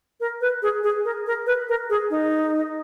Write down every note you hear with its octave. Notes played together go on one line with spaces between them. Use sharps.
A#4
B4
G#4
G#4
A#4
A#4
B4
A#4
G#4
D#4